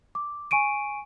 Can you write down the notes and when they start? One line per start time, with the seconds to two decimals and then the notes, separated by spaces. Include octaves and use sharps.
0.15 D6
0.51 G#5 C#6 D7 D#7